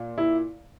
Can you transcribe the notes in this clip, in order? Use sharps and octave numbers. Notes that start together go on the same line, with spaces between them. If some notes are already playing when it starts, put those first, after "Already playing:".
Already playing: A#2
E4